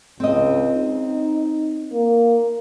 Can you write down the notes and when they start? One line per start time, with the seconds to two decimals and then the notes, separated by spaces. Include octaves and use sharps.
0.20 C#2 C4 D#5
0.75 D#4
1.93 A#3